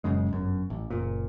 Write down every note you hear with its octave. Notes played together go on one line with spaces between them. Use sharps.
D#1 F#2 C#3 G#3
G1 F#2
A1
F#1 A#2